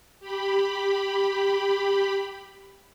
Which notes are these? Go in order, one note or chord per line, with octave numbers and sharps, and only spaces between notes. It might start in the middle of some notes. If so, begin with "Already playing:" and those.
G4 B5